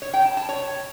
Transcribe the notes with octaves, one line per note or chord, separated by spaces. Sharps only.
C#5
G5
A5
A5
C#5